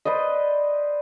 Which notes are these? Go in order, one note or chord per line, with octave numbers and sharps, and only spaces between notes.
B4 C5 D5 D#5